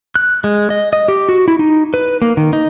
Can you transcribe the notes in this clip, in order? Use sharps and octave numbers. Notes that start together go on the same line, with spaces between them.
F#6
G#3
D#5
D#5
G4
F#4
E4
D#4
B4
A#3
D#3
D#4